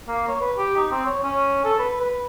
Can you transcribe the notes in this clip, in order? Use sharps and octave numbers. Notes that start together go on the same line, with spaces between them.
A#3
C#5
B4
G4
D#4
C4
C#5
C#4
A4
B4
B4